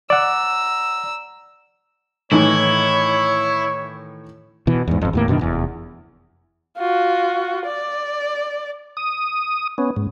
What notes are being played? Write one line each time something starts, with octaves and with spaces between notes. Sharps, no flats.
D5 F#5 A#5 E6
A2 D#3 E3 E4 C#5
B2 E3
E2 G#2
G#1 F2
D#2 A2 A#3
F#2 B2 D#3 D4
F1 E2
F4 F#4
D5
D#6
B3 C#4
G#2